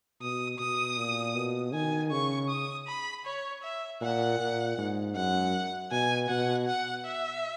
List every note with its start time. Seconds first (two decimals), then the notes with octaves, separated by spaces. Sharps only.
0.21 B2 D#6
0.59 B2 D#6
0.97 A#2
1.35 B2
1.73 D#3 G#5
2.11 C#3 C#6
2.49 D#6
2.87 B5
3.25 C#5
3.63 E5
4.01 A#2 F#5
4.39 A#2
4.77 G#2
5.15 F#2 F#5
5.91 B2 G#5
6.29 B2 F#5
6.68 F#5
7.05 E5